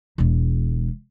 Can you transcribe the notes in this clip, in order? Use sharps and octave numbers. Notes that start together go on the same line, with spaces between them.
E1 G#3